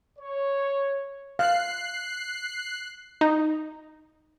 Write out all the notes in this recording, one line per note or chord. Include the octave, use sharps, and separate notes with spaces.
C#5
F5 F#6 C7
D#4